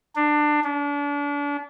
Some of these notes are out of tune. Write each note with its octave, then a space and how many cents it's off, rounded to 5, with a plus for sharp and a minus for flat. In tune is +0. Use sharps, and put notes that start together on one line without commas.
D4 +20
D4 -35